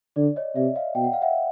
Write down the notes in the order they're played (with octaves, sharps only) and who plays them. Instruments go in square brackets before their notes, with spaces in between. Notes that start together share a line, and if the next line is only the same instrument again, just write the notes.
[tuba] D3 [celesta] D5
[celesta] C#5 D#5
[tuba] C3 [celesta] D5 E5
[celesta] D#5 F5
[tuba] B2 [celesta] G5
[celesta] F#5
F5
E5 F#5